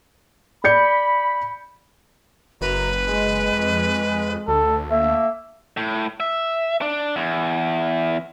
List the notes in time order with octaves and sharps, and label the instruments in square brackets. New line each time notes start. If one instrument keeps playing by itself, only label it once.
[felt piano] D5 G6 C#7 [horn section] B5
[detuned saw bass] F#1 [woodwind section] F#2 A#5 [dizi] B4
[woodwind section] G#3
[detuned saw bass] F2
[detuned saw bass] D2 [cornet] A4
[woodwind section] A3 A#3 [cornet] E5
[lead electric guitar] A2
E5
D4
E2